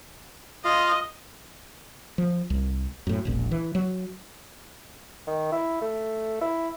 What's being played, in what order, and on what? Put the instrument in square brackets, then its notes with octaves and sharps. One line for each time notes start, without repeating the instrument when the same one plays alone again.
[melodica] F4 F5 [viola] D#5
[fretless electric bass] F3
C2
F#2 A2
E1 A#1 A#2
E3
F#3
[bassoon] D#3
E4
A3
E4